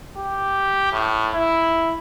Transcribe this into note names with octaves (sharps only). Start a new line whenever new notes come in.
G4
A2
E4